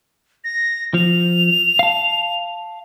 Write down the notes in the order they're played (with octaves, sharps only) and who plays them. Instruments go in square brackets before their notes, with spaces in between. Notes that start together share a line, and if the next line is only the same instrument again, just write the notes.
[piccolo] A#6
[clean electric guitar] F3 [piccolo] F7
[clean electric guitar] F5 A5